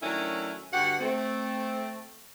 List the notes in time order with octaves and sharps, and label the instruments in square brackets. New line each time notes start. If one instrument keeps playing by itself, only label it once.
[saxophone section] D#3 F#3 A3 C#4 D4 E4
G2 D3 F#4 G4 F#5
A3 C4